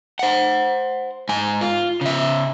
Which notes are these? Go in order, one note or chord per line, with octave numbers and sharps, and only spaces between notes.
C5 F#5
G#2 G#5
F4
C#3 E5